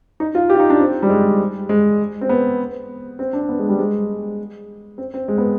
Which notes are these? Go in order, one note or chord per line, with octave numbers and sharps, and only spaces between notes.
D#4
F4
G4
F4
D#4
D4
C4
G3
G#3
G#3
C4
B3
C4
D4
C4
B3
G#3
G3
G#3
C4
C4
G#3
B3